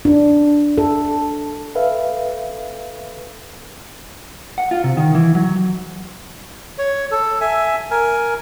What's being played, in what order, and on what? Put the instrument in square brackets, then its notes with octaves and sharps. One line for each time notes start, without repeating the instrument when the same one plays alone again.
[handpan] D4
A4
[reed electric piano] A4 B4 E5 F5
[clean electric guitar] F#5
F4
C3
D#3
E3
F#3
[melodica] C#5
A4
E5 G#5
A#4 G#5